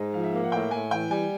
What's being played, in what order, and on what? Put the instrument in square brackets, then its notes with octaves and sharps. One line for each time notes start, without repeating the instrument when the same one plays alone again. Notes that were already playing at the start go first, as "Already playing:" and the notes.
Already playing: [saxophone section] G#2 [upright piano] D#5
[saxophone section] F3 [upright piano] F5
[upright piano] E5
[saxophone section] A#3 [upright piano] F5
[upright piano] F#5
[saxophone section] A2 [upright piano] G5
[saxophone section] A2 [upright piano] G#5
[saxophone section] E3 [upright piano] G5
[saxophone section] G3 [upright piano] G#5